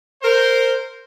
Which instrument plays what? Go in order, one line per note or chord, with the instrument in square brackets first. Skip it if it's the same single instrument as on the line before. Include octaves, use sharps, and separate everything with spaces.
[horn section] A#4 C5